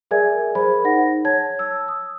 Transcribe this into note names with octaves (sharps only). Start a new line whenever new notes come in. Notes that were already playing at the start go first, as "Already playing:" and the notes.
G#4 A#4 D5 E5 G#5 G#6
G#4 A#4 C5 B5
D#4 F#5 A#6
C#5 A5 G#6
E6
D#6